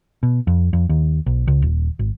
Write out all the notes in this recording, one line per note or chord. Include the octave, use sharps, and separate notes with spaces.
B2
F2
F2
D#2
B1
C#2
D#1
G#1